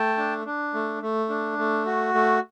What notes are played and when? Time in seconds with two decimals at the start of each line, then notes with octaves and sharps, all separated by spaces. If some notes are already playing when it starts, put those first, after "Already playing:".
Already playing: A3 G5 A5
0.17 D4
0.45 D4
0.74 A3
1.02 A3
1.29 D4
1.58 A3
1.86 F#4
2.14 A3